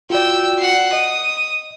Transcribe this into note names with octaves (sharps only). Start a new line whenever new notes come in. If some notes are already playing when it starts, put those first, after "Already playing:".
F4 F#4 D5 G5 E6
F#5 C7
D#5 D#6